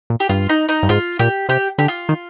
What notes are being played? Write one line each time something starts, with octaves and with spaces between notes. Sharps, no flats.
A#2
G4
G2 F4
D#4
D#4
G2
G#2 F4
A#2 G4
C3 G4
D3 G4
F4
D#3